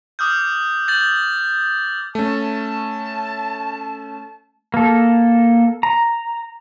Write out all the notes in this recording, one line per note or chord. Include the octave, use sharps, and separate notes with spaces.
D6 D#6 F6 G6
G6 A6 F#7
A3 C#4 A5
A#3 A4
A#5